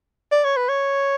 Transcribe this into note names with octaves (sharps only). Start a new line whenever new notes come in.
D5
C#5
B4
C#5